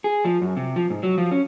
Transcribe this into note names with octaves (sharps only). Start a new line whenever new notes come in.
G#4
F3
F#2
C3
F3
G#2
F#3
F3
C#4